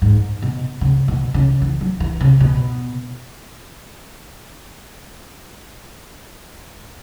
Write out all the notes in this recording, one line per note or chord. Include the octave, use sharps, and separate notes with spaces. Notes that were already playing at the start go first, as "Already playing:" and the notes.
G#2
B2
C#3
B2
C#3
E3
F#3
E3
C#3
B2